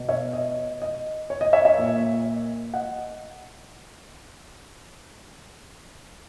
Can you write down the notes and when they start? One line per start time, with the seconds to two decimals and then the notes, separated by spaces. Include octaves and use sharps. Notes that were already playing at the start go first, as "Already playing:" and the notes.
Already playing: B2
0.09 C#5 E5
0.33 D#5
0.82 D#5
1.30 C#5
1.41 D#5
1.53 C#5 E5
1.65 C#5 E5
1.78 A#2
2.74 D#5 F#5